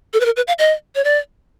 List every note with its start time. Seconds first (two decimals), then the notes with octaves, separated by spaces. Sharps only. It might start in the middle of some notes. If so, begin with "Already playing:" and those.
0.13 A4
0.20 B4
0.25 A#4
0.36 B4
0.48 F5
0.59 D#5
0.95 C#5
1.04 D5